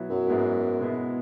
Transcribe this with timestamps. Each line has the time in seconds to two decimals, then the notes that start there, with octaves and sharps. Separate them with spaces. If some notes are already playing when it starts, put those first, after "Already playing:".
Already playing: B2 F#3 B3 E4
0.10 F#2
0.27 G#2 G#3 B3 E4
0.81 B2 G#3 B3 E4